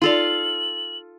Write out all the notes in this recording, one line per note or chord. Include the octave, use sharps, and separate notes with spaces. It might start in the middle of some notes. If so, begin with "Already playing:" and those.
D#4 F4 A4 D5 F5 F#7